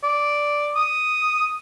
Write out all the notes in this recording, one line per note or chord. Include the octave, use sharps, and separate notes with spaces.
D5
D#6